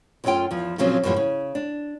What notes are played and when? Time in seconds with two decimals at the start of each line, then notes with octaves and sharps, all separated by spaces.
0.24 F#2 E3 A3 C#4 F4 G5
0.51 E2 F3
0.78 A#2 C#3 F3 F#3 C4 C#4
1.03 F#2 A2 E3 F3 G3 B3
1.16 C#3
1.55 D4